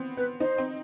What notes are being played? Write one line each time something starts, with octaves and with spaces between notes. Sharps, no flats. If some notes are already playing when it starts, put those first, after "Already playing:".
Already playing: B3 C4
B3 B4
D#4 C5
C4